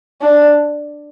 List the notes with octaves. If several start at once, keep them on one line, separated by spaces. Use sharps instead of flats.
D4